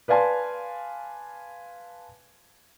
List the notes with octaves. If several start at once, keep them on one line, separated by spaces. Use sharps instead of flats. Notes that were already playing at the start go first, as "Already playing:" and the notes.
B4 D5 F5 G#5 A5 C6